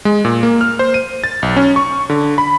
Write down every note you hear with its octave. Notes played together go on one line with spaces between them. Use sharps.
G#3
A#2
A#3
F6
C5
D#7
A6
B1
C#4
C#6
D3
B5